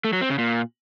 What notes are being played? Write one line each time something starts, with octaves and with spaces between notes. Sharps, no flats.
A3
F#3
C4
C#3
A#2